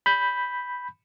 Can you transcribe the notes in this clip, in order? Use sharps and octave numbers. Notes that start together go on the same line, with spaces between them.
B5 G6